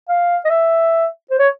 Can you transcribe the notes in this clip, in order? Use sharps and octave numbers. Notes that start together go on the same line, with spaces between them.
F5
D#5
E5
C5
C#5